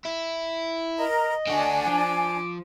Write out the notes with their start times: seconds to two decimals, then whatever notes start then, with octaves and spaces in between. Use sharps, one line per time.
0.05 E4
0.99 A#4 D#5 A#5
1.47 D3 D4 F#4 G#5
1.87 F3 D6